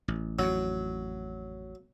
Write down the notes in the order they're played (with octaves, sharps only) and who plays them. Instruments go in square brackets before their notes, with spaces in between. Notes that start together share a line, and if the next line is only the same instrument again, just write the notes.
[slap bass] A1
[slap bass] A1 F2 [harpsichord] F#3